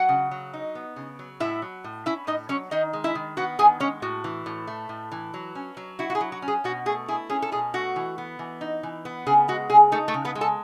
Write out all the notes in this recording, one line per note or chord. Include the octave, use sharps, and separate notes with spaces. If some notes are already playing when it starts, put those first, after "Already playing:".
Already playing: F#3 F#4 F#5
C#3
F#3
D#4
B3
C#3
F#3
A2 E4 E5
F#3
A2
C#4 E4 E5
A2 D#4 D#5
F#3 C#4 C#5
D#3 D#4 D#5
G#3
E4 E5
D#3
B3 F#4 F#5
D#3 G#4 G#5
G#3 C#4 C#5
A2 F#4
E3
A2
A3
A2
E3
F#3
C#4
F#3
E4 F#4
F#4
G#4
F#3
F#4
C#4
G#4
B2 F#4
A3 G#4
E4 G#4
C#4 G#4
A4
B2 G#4
A3 F#4
E3
B3
E3
D#4
E3
B3
C#3 G#4
G#3 F#4
C#3 G#4
A3 D#4 A4
A3 A4
C#3
B3 B4
G#3
A4 A5